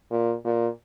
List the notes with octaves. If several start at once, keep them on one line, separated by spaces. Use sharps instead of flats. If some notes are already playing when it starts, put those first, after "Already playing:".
A#2
A#2